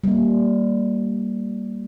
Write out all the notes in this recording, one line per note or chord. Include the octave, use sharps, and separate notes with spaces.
G3 A#3